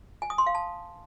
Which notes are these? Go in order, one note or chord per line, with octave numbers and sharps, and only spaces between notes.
G#5
D#6
C6
F5
A5